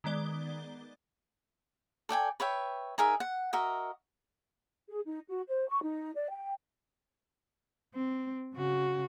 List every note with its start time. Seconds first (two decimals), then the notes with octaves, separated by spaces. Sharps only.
0.04 D#3 G#3 B3 D5 G7
2.09 A4 D5 G5 G#5
2.40 B4 C#5 E5 G5
2.98 D#4 G#4 A#4 E5
3.20 F#5
3.53 F#4 A#4 D#5 E5
4.88 G#4
5.06 D#4
5.29 F#4
5.48 C5
5.68 C#6
5.83 D#4
6.16 D5
6.31 G5
7.95 C4
8.54 C#3 F#4